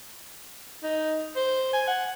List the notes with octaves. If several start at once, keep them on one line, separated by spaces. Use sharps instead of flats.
D#4
C5
G#5
F#5